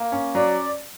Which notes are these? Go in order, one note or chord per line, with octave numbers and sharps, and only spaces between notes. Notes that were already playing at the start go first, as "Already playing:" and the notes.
Already playing: A#3
C#4
F#3 D5